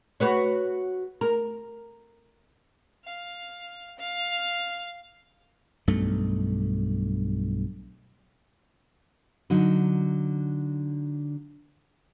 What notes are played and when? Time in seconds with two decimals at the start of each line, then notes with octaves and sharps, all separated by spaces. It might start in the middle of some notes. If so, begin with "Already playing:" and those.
0.20 F#4 B4 C#5
1.21 A#4
3.05 F5
3.98 F5
5.88 B1 G2 A3
9.50 D3 F#3 D#4